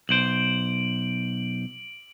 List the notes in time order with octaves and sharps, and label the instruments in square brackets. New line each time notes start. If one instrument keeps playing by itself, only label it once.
[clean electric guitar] B1 C5 [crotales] D7 F#7